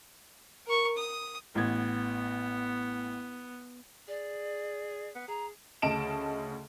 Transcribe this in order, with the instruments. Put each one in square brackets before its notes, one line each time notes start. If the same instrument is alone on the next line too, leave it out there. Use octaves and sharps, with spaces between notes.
[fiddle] A#4 C#6
D#6
[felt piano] A1 G#6 [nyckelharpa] B3
[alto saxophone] G#4 [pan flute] D5
[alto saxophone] B3
[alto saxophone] G#4 [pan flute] A#5
[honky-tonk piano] D2 C#3 D#5 A5 D7 E7